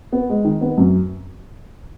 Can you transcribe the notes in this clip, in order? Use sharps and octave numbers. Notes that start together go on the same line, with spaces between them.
B3
G#3
D#3
B3
F#2